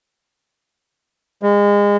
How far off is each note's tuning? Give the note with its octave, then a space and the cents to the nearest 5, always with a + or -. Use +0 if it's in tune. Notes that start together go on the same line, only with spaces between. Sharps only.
G#3 -30